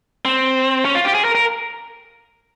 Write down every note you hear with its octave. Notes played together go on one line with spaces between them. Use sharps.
C4
C#4
F4
G4
G#4
A#4
A#4